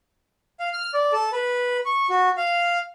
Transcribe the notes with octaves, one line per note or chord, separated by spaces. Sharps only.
F5
F6
D5
A4
B4
C#6
F#4
F5